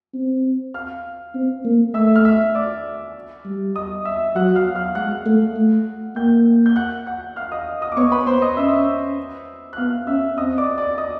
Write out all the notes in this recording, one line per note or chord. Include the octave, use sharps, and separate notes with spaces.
C4
F5 F6
C4
A#3
A3 E5 E6
F6
E5 E6
D5 D6
G3
D#5 D#6
E5 E6
F#3 F#5 F#6
F5 F6
F5 F6
G#3 F#5 F#6
A3
A3
A#3 G5 G6
G6
F#5 F#6
F#5 F#6
F5 F6
D#5 D#6
D#5 D#6
D6
B3 C#5 C#6
B4 B5
B3 C5 C6
D#5 D#6
C#4 E5 E6
F#6
B3 F5 F6
C#4 E5 E6
C4 D#5 D#6
D5 D6
D5 D6
D#5 D#6